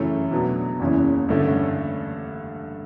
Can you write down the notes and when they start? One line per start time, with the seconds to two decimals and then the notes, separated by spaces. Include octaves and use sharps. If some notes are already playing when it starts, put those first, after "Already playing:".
Already playing: F#2 C#3 E3 A3
0.31 B2 F#3 B3 D4
0.80 F#1 E2 C#3 E3
1.29 G2 D3 A3 C#4